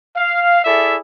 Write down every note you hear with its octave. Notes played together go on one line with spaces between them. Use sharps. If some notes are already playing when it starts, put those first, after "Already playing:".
F5
E4 G#4 A4 D5 E5